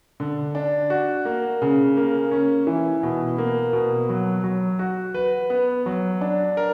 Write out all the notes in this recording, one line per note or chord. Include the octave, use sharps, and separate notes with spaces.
D3
D4
F#4
A#3
C#3
A#3
C#4
E3
B2
A#3
B2
F#3
F#3
F#4
B4
B3
F#3
D4
A#4